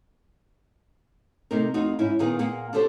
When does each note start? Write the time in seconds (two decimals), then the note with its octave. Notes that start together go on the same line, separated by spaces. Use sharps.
1.51 C3 A3 D#4 A#4
1.74 F2 C4 D#4 F#4
1.99 G#2 C#4 E4
2.19 A#2 D#3 A#3 B3 G#4
2.39 A#2 A#3 G#4 F#5
2.73 D4 F#4 G4 A4 C5